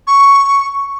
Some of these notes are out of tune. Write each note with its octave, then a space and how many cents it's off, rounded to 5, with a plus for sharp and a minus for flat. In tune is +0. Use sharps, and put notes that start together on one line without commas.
C#6 +5